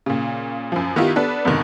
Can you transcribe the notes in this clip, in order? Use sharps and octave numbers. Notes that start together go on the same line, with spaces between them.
A#2 C#3
F#2 F3
D#3 B3 E4 F4 G4
B3 D4 A4 B4
F2 G#2 B2 D3 D#3